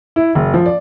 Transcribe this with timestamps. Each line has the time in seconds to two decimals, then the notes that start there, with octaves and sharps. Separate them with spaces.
0.16 E4
0.35 F#1
0.54 F3
0.66 D5